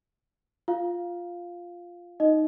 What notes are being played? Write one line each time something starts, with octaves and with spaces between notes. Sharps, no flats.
F4 F5
D#4 D#5